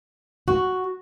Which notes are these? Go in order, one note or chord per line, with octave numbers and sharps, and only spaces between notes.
F#4